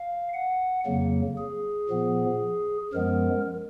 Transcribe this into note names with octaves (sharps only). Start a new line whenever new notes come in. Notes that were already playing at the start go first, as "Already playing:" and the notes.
Already playing: F5
F#5
F2 C#3 F#3 A#3
G#4
A#2 F3 B3
F#2 F3 G#3 B3 A#4